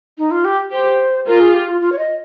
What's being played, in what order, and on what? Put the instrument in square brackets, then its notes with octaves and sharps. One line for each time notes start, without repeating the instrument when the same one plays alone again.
[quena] D#4
F4
G4
[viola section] G4 [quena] C5
[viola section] F4 [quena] A#4
[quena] G#4
G4
F4
F4
C#5
D#5